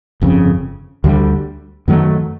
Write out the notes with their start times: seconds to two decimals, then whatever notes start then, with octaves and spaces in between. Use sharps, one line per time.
0.22 G1 F2 C#3
1.04 D2 D3 G3
1.88 F#2 D#3 F#3 A3